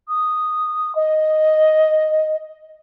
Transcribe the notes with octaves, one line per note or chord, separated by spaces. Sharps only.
D#6
D#5